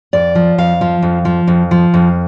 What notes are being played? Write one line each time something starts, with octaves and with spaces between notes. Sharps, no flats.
F2 D5
F3
F2 F5
F3
F2
F3
F2
F3
F2